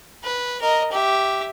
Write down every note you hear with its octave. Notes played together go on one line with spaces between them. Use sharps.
B4
A#4 D#5
G4 E5